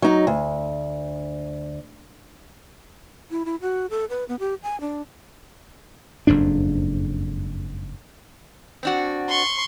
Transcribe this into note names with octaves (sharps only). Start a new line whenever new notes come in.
F#3 D#4
D2
E4
E4
F#4
A4
B4
B3
G4
G#5
D4
F#1 F2 G#2 D4
C4 D4 F#4
C6 C#6